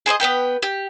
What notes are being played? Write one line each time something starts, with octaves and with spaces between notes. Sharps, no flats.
G#4 C5 C#5 D#5
B3 C#4 B4 G5
G4